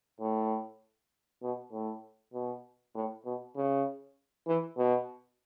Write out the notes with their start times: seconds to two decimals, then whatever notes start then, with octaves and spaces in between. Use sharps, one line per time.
0.20 A2
1.42 B2
1.72 A2
2.34 B2
2.95 A2
3.25 B2
3.56 C#3
4.47 E3
4.77 B2